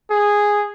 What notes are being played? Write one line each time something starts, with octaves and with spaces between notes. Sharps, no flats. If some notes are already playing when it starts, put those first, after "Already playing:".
G#4